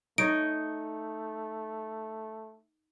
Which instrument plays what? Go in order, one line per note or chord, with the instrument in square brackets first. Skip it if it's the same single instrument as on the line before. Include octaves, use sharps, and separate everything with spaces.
[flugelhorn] A3 [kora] D#4 C#5 D#5 [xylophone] D7